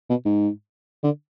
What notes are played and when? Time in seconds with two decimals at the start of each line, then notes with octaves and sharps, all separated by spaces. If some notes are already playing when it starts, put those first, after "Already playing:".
0.10 B2
0.25 G#2
1.03 D3